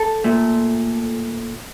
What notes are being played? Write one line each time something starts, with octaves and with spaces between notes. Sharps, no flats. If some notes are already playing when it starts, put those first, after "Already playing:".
Already playing: A4
A#2 A3